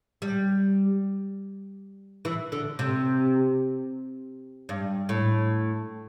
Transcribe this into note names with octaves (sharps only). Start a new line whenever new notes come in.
G3
E3
D3
C3
G2
A2